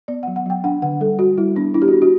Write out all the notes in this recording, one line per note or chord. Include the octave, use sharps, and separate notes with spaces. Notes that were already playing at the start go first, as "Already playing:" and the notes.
B3 D5
F#5
F#3
F#5
F#3 G5
D4 F#5
D3 F#5
G3 A4
G3 F#4
G3 E4
B3 D4
D4 E4
G4
F#4
D4
F#4